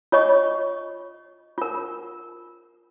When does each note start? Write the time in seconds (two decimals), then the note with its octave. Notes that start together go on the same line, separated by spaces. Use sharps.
0.12 F4 C#5 D#5 C#6
1.58 F4 A#4